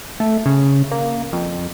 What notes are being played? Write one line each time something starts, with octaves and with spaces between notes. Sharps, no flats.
A3
C#3
A#3
F2